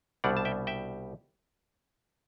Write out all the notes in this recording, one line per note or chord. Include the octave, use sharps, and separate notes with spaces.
C2 B2 G3 D4 D5 F#5
A5
E5 G5
E5 G5